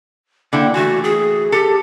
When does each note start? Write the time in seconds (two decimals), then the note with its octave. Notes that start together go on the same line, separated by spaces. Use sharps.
0.53 D3 A#3 E4 G5
0.74 E3 A3 F#4
1.04 G#4
1.52 G4 A4